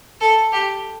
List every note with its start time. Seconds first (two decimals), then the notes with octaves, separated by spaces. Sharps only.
0.21 A4
0.52 G4